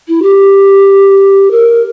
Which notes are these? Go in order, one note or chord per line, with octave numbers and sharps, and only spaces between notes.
E4
G4
A#4